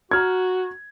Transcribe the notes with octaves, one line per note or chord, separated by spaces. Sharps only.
F#4 A#5 F6 G#6